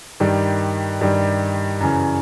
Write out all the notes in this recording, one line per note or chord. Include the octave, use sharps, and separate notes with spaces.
G2 D#3 G3
G2 D#3 G3
F#2 C#3 E3